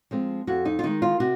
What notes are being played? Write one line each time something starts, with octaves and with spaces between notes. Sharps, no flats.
F3 G#3 C4
F2 F#4
D#4
F4
D#3 G#3 D#4
F4
C3 F#4